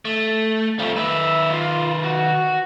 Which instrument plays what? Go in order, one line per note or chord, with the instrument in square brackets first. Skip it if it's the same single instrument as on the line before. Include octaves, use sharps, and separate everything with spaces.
[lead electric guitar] A3
[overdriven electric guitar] G3 A3 [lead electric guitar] C4 F4
[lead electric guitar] D#3 B4 [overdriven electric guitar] E5
[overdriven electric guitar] F4
F#4